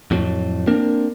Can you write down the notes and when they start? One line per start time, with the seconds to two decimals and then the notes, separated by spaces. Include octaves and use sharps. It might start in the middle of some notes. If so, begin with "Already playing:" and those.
0.11 F2 A2 F#3
0.67 A#3 C4 D4 A#4